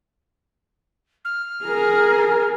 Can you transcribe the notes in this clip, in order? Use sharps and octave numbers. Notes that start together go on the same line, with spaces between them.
F6
G#4 A#4